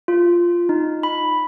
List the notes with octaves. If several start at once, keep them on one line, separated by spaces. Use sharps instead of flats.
F4
D#4
B5